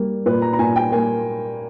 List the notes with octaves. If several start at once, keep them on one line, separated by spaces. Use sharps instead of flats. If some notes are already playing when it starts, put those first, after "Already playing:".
Already playing: G3 A#3
A#2 B4
A#5
A#5
A#2 G#5
G5
A#3 G#5